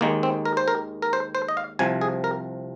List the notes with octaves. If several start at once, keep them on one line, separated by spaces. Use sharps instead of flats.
D#2 D#3 G#3 A#3
C4
A#4
C5
A#4
A#4
C5
C5
D#5
F5
C2 C3 F3 G#5
G#4
A#4